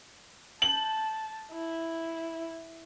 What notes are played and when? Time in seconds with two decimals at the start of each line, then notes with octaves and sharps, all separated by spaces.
0.62 A5 F#7
1.52 E4